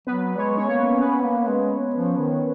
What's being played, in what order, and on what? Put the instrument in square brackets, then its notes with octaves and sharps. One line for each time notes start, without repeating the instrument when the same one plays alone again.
[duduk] F#3 [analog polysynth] B3 B4
[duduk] G#3 [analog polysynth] C#5
[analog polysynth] C#4 C#5
[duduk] A#3 [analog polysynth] C#5
[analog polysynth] B4
C#4 C#5
[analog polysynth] B3 B4 [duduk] C#4
[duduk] A#3
G#3
F3
D#3